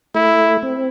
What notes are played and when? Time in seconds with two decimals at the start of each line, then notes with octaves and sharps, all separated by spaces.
0.15 A3 E4
0.63 C4